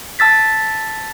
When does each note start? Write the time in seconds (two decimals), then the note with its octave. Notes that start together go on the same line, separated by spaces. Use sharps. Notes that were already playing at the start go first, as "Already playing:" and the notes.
0.19 A5 E6 A6 B6